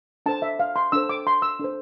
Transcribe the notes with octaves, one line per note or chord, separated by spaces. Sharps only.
D4 A4 C5 A5
E5
F5
C6
D4 A4 C5 E6
D6
C6
E6
D4 A4 C5